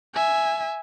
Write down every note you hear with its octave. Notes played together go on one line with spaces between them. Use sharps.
E5 G#5